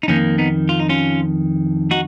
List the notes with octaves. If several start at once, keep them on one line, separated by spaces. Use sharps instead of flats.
D#4
F2 D#3 A#3 C#4
B3 D#4
F4
D#4
C#4 F4
D#4 F#4